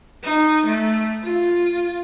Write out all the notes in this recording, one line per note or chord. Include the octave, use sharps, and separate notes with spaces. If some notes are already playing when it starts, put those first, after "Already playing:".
D#4
A3
F4